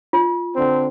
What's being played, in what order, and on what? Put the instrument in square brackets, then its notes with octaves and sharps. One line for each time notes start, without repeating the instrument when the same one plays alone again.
[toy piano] F4
[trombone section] D3 C4